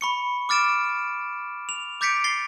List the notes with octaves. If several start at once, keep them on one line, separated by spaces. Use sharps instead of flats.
B5 C#6 C#7
D6 F6 A6 D7 E7
F7
D6 G6 A6 B6 C#7 D7
A6 C7 G7